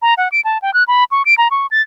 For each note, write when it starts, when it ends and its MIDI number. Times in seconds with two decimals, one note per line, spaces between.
0.02 0.14 82
0.17 0.28 78
0.32 0.41 98
0.45 0.58 81
0.62 0.73 79
0.74 0.84 90
0.88 1.04 83
1.11 1.22 85
1.26 1.34 98
1.38 1.48 82
1.51 1.67 85
1.71 1.82 93